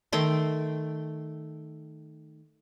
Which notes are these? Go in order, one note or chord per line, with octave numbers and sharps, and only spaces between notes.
D#3 A3 G5 C6